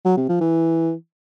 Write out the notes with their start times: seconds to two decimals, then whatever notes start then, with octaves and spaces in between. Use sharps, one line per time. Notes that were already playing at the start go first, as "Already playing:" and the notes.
0.05 F#3
0.17 C3
0.29 F3
0.41 E3